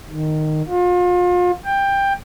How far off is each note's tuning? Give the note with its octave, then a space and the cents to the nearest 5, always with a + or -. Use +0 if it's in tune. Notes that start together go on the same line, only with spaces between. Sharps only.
D#3 -10
F4 +35
G5 +15